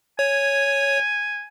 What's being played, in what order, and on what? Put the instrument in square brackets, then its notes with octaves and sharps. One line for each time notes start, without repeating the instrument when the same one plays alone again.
[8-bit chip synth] C#5 [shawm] G#5